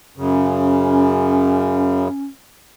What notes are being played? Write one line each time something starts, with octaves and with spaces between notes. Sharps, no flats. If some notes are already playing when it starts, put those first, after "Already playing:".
F#2 C#3 C#4